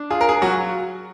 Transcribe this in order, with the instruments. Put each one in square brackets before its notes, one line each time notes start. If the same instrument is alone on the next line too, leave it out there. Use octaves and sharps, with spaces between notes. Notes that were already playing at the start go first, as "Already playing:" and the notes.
Already playing: [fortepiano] D4
[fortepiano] F4 [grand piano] G#4
[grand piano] A#4
G#4
[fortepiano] F#3 [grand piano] F#4